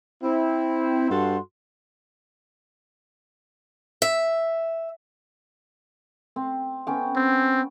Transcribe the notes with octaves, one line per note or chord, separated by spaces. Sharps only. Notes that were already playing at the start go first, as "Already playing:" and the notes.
C4 E4
G2 F#4 A4 F#5 C6
E5
C4
B3 C#4 G5
C4